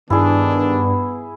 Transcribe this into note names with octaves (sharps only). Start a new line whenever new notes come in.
G2 D#3 B3 D4 E4 G#4